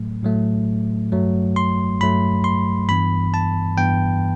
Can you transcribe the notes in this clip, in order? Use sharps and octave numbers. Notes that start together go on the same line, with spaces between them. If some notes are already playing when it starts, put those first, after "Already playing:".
Already playing: A2 F#3 A3
A2 F#3 A3
G2 F#3 A3
C6
G2 F#3 A3 B5
C6
G2 E3 B3 B5
A5
G2 E3 B3 G5